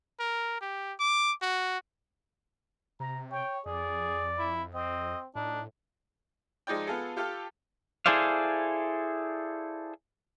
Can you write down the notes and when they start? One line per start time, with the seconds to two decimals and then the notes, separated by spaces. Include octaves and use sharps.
0.20 A#4
0.61 G4
0.99 D6
1.42 F#4
3.00 C3 A#5
3.31 C#5 G5
3.66 F2 G#4 D5
4.39 E4
4.74 C4 D#5
5.35 A2 D4 D#4
6.67 F3 G#3 D#4 D5 G5
6.87 B3 F4 G#4 A4
7.16 F4 G4 A4 F5
8.06 E4 G#4 A4 C5 D5 F5